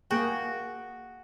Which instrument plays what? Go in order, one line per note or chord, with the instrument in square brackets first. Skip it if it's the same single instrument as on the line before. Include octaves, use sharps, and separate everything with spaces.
[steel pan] A#3 G#4 G5 [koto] F#4